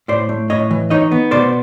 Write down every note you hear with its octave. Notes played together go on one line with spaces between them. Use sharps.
A2 C5 D5
A3
A2 C#5 D#5
E3
D#4 C#5 D#5
B3
B2 C5 D5